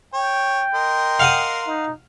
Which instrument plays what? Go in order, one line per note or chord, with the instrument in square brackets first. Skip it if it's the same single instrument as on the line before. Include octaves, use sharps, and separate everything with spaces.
[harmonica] C#5 [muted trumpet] G5
[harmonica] A#4 D#5 C6
[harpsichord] F5 F#5 D#6
[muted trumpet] D#4